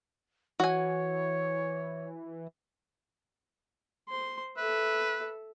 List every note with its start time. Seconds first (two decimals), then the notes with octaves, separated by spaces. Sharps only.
0.60 E3 F#4 C#5 G#5
4.09 C5 C6
4.57 A4 B4 E5